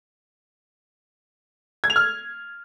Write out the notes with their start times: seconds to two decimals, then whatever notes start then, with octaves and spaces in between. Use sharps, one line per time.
1.84 G#6
1.90 F7
1.96 F6